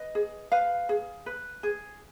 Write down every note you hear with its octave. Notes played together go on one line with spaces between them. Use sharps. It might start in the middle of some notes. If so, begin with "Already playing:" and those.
Already playing: B4 D#5
G#4
B4 F5
G#4
B4
G#4